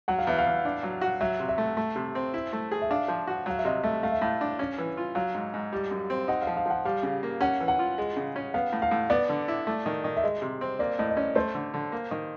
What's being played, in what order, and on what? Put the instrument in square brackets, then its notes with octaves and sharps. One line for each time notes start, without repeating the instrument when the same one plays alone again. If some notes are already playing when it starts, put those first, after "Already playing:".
[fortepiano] F#3 [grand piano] F#5
[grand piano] F5
[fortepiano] E2 [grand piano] E5
[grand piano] F5
[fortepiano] E2
D4
F#3
F#4
[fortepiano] F#3 [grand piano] E5
[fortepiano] C3
[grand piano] E5
[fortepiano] A3
A3
C3
C4
E4
A3
G#4
[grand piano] E5
[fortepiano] D4 [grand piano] F5
[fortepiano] F3
F#4
[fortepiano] F#3 [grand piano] F5
[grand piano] E5
[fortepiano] C3 [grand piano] D#5
[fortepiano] A3 [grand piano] E5
[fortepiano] A3 [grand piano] F5
[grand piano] E5
[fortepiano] A2 [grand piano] F5
[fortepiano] D4
C#4
E3
F4
[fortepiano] F#3 [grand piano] F5
[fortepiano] G#2
G#2
G3
F#2
C4
[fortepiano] D#4 [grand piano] F#5
[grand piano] F5
[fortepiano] F3
[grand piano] F5
[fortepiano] F3 [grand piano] F#5
[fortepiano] G3 [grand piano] F5
[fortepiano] C#3
A#3
[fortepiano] C#4 [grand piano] F#5
[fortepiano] E3
[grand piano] F#5
[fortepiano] F4
G#3
C#3
C#4
[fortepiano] B3 [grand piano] F5
[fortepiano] A2
[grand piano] F5
[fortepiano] A2
[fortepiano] B3 [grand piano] D5
[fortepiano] D3
E4
A3
D#3
D#3
[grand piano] E5
[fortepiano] G#3 [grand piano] D#5
[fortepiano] C3
C4
[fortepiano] A#3 [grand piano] D5
[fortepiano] A2 [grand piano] D#5
[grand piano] D#5
[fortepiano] C#4 [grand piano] D5
[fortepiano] A3 [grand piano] C5
[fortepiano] D3
D3
A#3
D#3